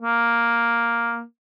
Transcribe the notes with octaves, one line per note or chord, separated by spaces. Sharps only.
A#3